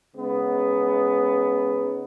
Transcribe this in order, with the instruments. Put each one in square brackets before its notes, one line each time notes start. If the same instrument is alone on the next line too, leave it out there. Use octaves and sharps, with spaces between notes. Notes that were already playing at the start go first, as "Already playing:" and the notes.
[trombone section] C#3 G#3 B3 D#4